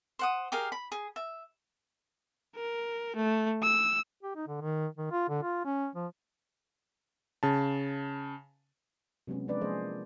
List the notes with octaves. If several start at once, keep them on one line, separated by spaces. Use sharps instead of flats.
C5 F#5 D#6
G4 G#4 A#4 F5
B5
G#4
E5
A#4
A3
E6
G4
D#4
D3
D#3
D#3
F4
D3
F4
C#4
F3
C#3 A5
C3 F#3 G#3 B3 C#4
F3 G#3 B3 D4 B4 D5
F3 G#3 A#3 G#4 C5 D#5